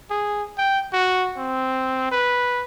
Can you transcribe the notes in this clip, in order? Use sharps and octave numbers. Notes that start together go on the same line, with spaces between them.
G#4
G5
F#4
C4
B4